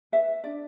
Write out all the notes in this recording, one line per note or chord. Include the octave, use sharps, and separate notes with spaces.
B4 E5
D4 D5